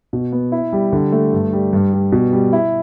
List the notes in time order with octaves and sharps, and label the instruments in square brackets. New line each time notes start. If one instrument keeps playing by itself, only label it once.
[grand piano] B2
B3
E4
G3
D3
A3
G2
G3
G2
G3
B2
G3
E4